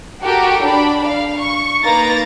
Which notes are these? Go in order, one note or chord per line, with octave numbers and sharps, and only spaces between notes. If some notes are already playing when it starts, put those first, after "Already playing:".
F#4 G4 A4 A#4
D4 B5
F5
C#6
A#3 D#4 B4 A#5 A6 A#6